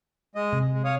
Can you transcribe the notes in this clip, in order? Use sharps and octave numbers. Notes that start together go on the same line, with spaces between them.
G#3 D#5
C3
G#3
C#5 F5 D#6